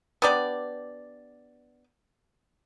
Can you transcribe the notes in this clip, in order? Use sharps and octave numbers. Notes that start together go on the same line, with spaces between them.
B3 D4 G4 D5